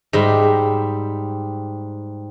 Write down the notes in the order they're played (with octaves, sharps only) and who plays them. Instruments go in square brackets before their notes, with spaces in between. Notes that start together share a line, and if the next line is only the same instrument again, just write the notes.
[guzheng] G#2 G3 E5